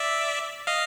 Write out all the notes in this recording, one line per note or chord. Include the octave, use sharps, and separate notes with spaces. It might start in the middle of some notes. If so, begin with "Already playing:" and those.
Already playing: D5 E5
D#5 F5